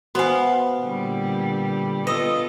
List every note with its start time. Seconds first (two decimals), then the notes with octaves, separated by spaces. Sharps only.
0.15 B3 F#4 C5 F5 G#5
0.80 A#2 D3 G3
2.07 B3 F4 A4 B4 D#5 D#6 E6